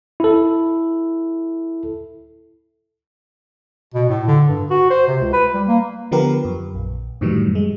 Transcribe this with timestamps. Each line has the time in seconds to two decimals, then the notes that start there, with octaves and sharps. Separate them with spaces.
0.20 E4 A4
3.94 B2
4.10 A2
4.28 D3
4.48 G2
4.71 F#4
4.90 C5
5.07 C3
5.21 C#2
5.33 B4
5.54 G3
5.68 A#3
6.11 D3 F3 B3 G4 A#4 B4
6.45 F#2
6.75 A#1
7.21 F#2 A2 D#3 E3 F#3 G3
7.55 G#3